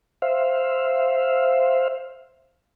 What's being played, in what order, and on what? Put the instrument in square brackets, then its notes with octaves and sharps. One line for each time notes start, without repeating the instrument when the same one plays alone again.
[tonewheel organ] C5 E5 F5